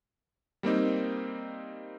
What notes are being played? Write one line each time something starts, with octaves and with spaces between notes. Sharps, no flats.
G3 A#3 C4 D#4